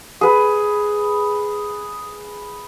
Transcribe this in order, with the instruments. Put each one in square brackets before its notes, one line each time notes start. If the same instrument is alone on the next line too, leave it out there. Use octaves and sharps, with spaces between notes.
[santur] G#4 B4